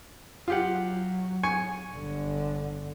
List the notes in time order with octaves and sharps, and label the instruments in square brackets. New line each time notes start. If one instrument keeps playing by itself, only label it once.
[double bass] F#3 [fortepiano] F4 G4 F#5
[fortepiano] G#5 C#6
[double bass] G1 D3